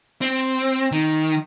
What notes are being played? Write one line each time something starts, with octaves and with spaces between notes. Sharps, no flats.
C4
D#3